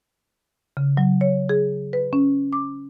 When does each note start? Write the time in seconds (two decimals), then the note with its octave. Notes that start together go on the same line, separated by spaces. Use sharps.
0.77 C#3
0.97 F#3
1.21 C#5
1.49 G#4
1.93 B4
2.13 C#4
2.53 D6